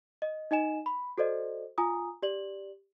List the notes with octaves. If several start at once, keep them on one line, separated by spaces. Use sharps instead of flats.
D#5
D#4 D#5 G#5 E7
B5
F#4 A4 C5 D5 D#5
F4 G#5 A#5 D#6
G4 D5 F#7